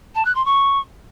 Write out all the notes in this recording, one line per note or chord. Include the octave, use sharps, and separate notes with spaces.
A5
F#6
C6
C#6